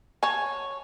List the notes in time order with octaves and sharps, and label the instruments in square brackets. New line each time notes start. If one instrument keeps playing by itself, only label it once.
[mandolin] C#5 [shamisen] G#5 A5